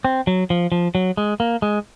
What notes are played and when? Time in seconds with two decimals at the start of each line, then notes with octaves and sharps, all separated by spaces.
0.05 C4
0.27 F#3
0.50 F3
0.72 F3
0.95 F#3
1.17 G#3
1.40 A#3
1.62 G#3